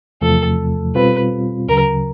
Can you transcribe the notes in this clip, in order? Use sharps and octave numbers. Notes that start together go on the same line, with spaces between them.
E2 C3 F3 A3 A4
B2 G3 C4 F4 B4
D2 C#3 F#3 A#4